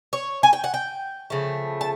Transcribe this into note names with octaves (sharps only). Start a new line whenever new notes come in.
C#5
G#5
G5
F#5
G5
C#3 F3 A3
A5